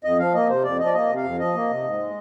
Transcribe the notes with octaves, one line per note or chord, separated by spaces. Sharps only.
F2 D#5
F3 F5
A#3 D#5
C3 C5
F2 D5
F3 D#5
D5
A#3 D#5
C3
F5
F2
F3 D#5
A#3
C3
G#2
G#3